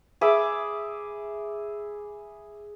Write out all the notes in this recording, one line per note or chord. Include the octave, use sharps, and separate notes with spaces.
G#4 E5 B5 D6